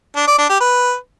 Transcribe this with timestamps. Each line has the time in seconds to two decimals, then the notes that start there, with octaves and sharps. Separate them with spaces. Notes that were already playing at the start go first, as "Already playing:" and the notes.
0.16 D4
0.27 D5
0.38 D4
0.49 G4
0.60 B4